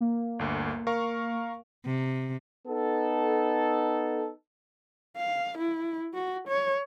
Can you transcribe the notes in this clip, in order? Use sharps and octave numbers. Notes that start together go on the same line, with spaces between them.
A#3
G1 D2
A#4 F5 C#6
C3
B3 D#4 A4
F5
E4
F#4
C#5